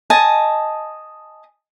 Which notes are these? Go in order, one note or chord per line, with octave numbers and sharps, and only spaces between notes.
D#5 G#5 A5